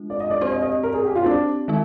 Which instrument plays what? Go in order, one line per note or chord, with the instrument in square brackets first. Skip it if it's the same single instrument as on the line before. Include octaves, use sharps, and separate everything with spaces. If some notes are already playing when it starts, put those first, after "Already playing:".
Already playing: [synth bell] G#3 D4 F4
[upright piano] D5
D#5
D5
[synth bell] C4 G4 D5 [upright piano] C5
[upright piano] D#5
D#5
A#4
G#4
G4
F4
C4
D4
[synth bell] D#3 G#3 D#4